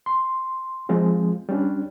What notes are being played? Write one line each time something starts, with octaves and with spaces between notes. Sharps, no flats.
C6
F3 G#3 C4
G3 C#4 D4